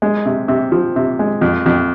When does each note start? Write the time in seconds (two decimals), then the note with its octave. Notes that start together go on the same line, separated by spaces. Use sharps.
0.02 G#3
0.26 C3
0.48 C3
0.72 F3
0.96 C3
1.19 G#3
1.41 F2
1.66 F2